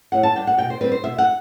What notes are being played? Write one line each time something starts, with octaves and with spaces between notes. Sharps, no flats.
A2 F#5
A5
G3 D4 G5
F#5
B2 G5
C5
G3 C4 B4
C5
B2 E5
F#5